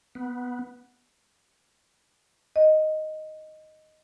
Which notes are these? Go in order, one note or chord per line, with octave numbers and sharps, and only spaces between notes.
B3
D#5